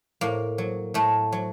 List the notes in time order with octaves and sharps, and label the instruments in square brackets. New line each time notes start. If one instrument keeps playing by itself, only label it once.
[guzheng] A2 A#3
F#3
A2 A3
F#3